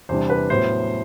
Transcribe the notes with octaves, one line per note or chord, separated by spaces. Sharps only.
E2 C3 G3 D4 C5
B4
A2 F#3 B3 C5